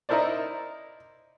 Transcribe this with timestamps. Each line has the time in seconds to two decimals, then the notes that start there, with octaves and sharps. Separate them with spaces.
0.09 D#4 E4 A#4 C5 D5